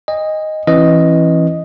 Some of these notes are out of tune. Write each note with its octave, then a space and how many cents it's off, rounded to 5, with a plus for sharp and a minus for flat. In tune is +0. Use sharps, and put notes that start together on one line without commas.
D#5 +0 G#5 -45
E3 +5 C#4 -40 D#5 +0